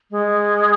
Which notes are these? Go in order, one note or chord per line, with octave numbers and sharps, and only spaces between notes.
G#3